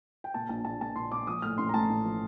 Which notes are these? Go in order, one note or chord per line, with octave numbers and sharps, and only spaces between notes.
G5
A#2 A5
A#1 A5
A#1 A5
A#2 A5
A#1 C6
A#2 D6
F3 D#6
A2 F6
A1 C6
A#5
A2 A5
A1
F3